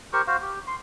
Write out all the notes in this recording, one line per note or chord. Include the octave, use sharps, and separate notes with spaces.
G4 A#4 C5 C#6
F#4 C5 F5
G4
C6